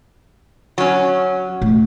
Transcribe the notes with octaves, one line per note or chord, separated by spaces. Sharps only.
F#3 C#4
A2